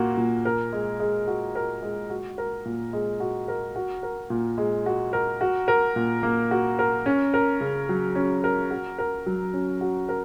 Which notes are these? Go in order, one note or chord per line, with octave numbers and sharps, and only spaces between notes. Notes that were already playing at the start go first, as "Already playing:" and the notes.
Already playing: A#2 A#3 F#4
A#2
A#4
G#3
G#3
F#4
A#4
G#3
F#4
A#4
A#2
G#3
F#4
A#4
F#4
A#4
A#2
G#3
F#4
A#4
F#4
A#4
A#2
A#3
F#4
A#4
C#4
A#4
C#3
F#3
C#4
A#4
F#4
A#4
F#3
C#4
F#4
A#4